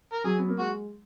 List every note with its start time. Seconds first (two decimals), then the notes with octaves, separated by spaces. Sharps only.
0.13 A#4
0.24 F#3 G#4
0.38 B3
0.48 A#3
0.59 G#3 F#4